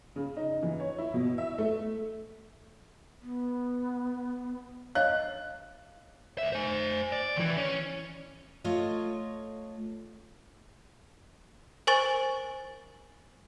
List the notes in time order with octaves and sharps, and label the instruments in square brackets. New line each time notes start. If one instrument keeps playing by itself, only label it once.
[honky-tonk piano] C#3
D#4
E3
C#5
E4
B2
E5
A3
[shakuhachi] B3
[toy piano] C#5 D#5 F5 [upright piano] F#6
[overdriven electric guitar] D2 E5
C5 G#5
D5
D#3 E3
C#4
[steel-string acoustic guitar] A3 F4 C#5 D#5
[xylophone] A#4 C5 G#5 C#6 A6 F#7